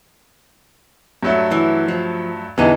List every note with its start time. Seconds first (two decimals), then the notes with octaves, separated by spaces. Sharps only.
1.23 G2 F#3 A3
1.51 E3
1.88 F3
2.58 E2 D3 E3 G3 D#4